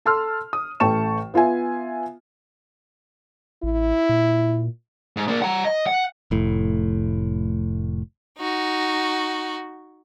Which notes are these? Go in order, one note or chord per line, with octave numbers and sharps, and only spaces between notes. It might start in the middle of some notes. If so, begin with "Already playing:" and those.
A4 A5 C6 E6 F6
D#6
A1 A3 G5 A5 C#6 E7
B3 F4 E5 G#5
A1 E4
A#2
G#2
A#3 D4
F#5 A#5
D#5
F#5
F1 A2
D#4 F#4